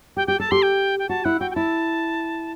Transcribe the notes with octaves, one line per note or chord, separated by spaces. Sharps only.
G4 G5
G4 G5
A4 A5
G4 C6
G5
G5
F#4 A5
E4 F#5
F#4 G5
G5
E4 A5